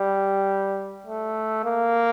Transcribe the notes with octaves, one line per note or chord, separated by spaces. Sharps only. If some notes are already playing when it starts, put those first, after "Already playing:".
Already playing: G3
A3
A#3